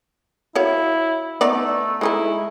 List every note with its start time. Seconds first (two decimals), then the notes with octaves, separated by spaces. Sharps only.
0.55 E4 F#4 C#5 F5
1.41 A3 B3 D#4 D5
2.01 G#3 A3 D#4 E4